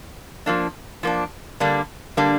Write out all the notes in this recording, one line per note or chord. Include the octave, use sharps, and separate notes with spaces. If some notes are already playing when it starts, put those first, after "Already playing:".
F3 A#3 D4
F3 A#3 D4
D3 G3 A#3 D4
D3 G3 A#3 D4